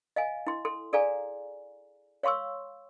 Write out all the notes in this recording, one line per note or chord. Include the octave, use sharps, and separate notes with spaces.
D#5 F5 G#5
E4 C6
A4 C6
G#4 A4 D5 F5 G#5 A#5
C#5 F5 C6 C#6 E6